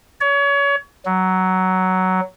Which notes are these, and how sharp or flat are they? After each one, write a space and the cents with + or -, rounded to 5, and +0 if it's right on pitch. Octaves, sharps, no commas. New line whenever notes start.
C#5 +30
F#3 +10